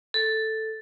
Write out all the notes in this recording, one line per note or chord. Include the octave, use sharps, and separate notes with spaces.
A4